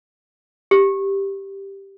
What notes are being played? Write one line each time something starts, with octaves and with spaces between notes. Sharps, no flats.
G4